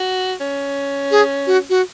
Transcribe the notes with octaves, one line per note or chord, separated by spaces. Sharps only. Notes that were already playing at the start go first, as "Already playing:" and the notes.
Already playing: F#4
C#4
G#4
F#4
F#4